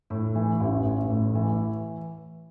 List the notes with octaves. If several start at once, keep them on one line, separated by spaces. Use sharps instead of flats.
A2
E3
A1
A1
A2
E3